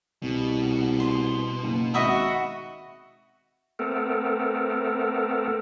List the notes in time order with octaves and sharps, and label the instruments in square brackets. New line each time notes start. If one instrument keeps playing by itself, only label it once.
[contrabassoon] C2 [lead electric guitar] B2
[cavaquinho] C6
[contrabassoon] F#1
[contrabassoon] G#1 [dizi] F#4 [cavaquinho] D#5 E5 B5
[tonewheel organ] A3 B3 C4 A4 A#4